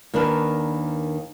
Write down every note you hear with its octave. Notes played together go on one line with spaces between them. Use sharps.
D#2 D#3 D4 A#4 B4 A5